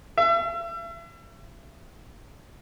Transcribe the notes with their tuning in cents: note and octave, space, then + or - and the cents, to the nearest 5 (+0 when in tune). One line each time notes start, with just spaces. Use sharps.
E5 +35